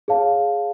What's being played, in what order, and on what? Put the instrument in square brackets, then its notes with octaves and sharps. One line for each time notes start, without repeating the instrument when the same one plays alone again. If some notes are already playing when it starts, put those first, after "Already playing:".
[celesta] G#4 C#5 F5 A5